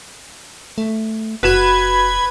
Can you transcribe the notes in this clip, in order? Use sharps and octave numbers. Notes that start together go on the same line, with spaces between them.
A3
F#1 F#4 B4 G#6 E7